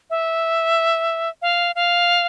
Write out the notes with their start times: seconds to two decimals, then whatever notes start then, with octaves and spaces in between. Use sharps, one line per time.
0.10 E5
1.42 F5
1.75 F5